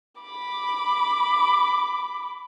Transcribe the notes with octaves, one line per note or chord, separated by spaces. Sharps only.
B5 D6